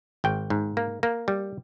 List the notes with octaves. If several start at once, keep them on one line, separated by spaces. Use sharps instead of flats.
G#1 G5
G#2
A#3
A#3
G3